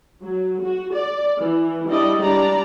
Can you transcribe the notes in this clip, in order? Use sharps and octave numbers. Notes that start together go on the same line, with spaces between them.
F#3
F#4
D5
E3
G3 D4 E4 D5 D#5
G3 D4 D5 A#5